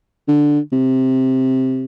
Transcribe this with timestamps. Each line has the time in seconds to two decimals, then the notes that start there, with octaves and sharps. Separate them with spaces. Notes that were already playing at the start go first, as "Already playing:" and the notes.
0.28 D3
0.73 C3